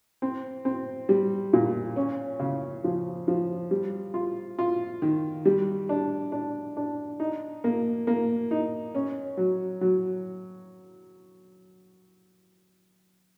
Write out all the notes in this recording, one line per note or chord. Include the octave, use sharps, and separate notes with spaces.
C4
C4
G3
A#2
C#4
C#3
F3
F3
G3
F4
F4
D#3
G3
D4
D4
D4
D#4
A#3
A#3
D#4
C#4
F#3
F#3